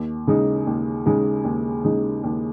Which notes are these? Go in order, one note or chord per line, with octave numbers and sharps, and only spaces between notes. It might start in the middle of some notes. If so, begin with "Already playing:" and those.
Already playing: D#2
C#3 G#3 D#4
D#2
C#3 G#3 D#4
D#2
C#3 G#3 D#4
D#2